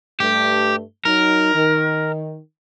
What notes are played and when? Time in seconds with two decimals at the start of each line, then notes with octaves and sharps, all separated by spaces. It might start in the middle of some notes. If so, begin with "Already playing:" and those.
0.20 G2 A3 G4
1.05 F#3 D#4 A#4
1.54 D#3